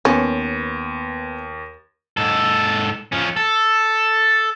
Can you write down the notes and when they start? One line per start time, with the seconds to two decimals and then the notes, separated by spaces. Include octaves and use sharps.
0.05 D#2 B3 C#4
2.17 G#2 A4
3.12 F3 C#4
3.37 A4